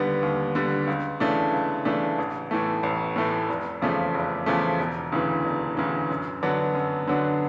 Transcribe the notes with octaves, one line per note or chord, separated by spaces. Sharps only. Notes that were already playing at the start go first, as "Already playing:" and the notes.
Already playing: D#2 D3 G3 B3
D#2
D3 G3 B3
C#2
C#3 E3 A3 D4
C#2
C#3 E3 A3 D4
A1
A2 E3 A3
A1
A2 E3 A3
F1
E2 C#3 F3 A3
F1
E2 C#3 F3 A3
E1
D2 C#3 E3
E1
D2 C#3 E3
F#2
D3 F#3 B3 D4
F#2
D3 F#3 B3 D4